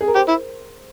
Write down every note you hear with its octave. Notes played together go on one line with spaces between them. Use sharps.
G#4
A#4
G4 C5
E4